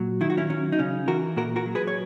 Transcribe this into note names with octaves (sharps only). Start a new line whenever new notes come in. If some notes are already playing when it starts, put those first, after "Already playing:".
Already playing: A#2 F#3
D#3 E4
F#4
C#4 E4
F#3 C#4
D#4
C#3 C#4
E3 F#4 A#4
A#2 F#4 A#4
F#4 A#4
F#3
G#4 B4
C#5